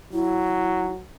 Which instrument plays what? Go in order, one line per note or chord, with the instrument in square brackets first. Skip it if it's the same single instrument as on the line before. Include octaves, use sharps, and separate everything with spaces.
[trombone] F#3 [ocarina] E4